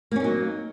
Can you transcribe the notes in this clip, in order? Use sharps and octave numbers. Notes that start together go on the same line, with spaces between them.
F#3 A#3 C#4 D#4